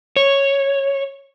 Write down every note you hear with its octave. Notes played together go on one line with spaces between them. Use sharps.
C#5